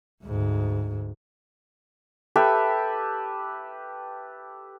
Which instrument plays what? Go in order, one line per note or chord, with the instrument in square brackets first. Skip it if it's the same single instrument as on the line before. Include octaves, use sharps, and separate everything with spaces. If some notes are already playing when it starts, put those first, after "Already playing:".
[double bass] D2 G#2
[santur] G4 A4 B4 E5